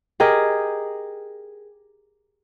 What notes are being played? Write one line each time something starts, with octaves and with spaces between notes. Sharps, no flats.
G4 G#4 A#4 D#5